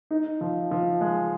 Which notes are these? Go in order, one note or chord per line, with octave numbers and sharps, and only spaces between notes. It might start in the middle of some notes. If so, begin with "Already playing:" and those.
D#4
F3
F3
G#3